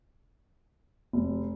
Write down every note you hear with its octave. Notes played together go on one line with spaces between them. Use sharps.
F1